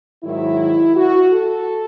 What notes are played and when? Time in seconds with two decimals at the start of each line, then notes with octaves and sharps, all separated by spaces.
0.24 G#2 D#3 F#3 E4
0.95 F#4
1.31 A4